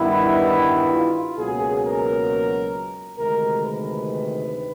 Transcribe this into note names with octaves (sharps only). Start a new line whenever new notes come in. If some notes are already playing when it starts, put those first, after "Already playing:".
Already playing: G2 D#3 G3 B3 E4
F4
C#2 B2 F#3 A#3 G#4
A#4
D2 C3 D#3 G#3 A#4
B4